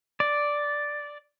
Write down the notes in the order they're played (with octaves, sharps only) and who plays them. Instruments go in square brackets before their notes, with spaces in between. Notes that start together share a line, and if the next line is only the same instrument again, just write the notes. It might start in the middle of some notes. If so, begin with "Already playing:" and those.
[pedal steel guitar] D5